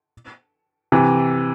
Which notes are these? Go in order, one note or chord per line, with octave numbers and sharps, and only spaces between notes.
C3 E3